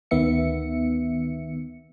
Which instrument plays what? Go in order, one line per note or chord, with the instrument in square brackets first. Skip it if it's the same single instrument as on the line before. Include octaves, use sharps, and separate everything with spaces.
[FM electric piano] D2 D#3 B3 E5 C#7